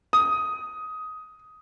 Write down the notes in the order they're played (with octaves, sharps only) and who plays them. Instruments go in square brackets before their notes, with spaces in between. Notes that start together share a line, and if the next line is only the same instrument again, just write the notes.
[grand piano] D#6